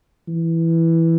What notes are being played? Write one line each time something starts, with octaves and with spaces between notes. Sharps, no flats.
E3